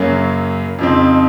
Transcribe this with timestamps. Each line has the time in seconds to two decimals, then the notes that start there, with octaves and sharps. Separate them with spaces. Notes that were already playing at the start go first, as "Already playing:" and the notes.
Already playing: F#2 C#3 F#3 A#3
0.79 F2 C#3 F3 C4 D#4